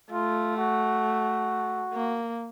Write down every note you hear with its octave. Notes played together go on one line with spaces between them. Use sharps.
A3 F4
F#4
A#3